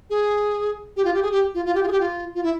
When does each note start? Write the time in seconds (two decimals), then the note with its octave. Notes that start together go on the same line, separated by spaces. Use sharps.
0.10 G#4
0.97 G4
1.05 F4
1.14 G4
1.23 G#4
1.32 G4
1.54 F4
1.65 F4
1.75 G4
1.83 F4
1.88 G#4
1.92 G4
2.01 F4
2.35 F4
2.44 E4